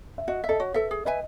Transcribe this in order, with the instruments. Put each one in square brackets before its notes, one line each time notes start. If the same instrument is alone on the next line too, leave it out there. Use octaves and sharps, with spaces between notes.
[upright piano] E5
[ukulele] F#4 [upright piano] D#5
[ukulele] E5
[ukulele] A4 [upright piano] D#5
[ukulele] F#4 [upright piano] C#5
[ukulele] A4 E5 [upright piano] B4
[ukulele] G#4
[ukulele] B4 E5 G#5 [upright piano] D#5